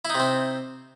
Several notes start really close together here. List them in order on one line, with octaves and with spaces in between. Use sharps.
E4 D#4 C3 C4